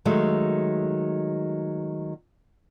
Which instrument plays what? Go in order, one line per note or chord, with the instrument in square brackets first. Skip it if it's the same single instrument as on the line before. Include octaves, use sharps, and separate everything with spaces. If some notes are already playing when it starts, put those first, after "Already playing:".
[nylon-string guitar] D#3 F#3 G#3 A3